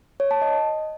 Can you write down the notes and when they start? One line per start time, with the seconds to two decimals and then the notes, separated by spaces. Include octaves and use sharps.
0.20 C#5
0.31 A5
0.42 D#5